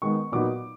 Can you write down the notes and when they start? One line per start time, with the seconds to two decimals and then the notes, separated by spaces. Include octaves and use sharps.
0.02 D#3 G#3 B3 D#4 C#6
0.32 A#2 F#3 B3 D#4 D6